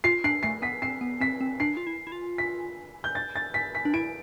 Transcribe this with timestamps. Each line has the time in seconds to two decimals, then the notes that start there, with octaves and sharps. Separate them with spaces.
0.04 F4 C7
0.24 D4 C7
0.43 A3 C7
0.62 B3 B6
0.82 C4 C7
1.01 B3
1.21 C4 B6
1.41 C4
1.60 D4 C7
1.77 F4
1.87 E4
2.07 E4
2.12 F4
2.38 B6
3.04 G6
3.15 A6
3.36 A6
3.54 B6
3.75 B6
3.85 D4
3.94 E4 D7